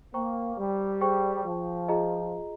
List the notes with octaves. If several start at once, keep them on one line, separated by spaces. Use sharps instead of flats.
A#3 C5 G5 A#5 C#6
G3
G#4 C5 G5 C#6
F3
F4 G#4 D#5 A#5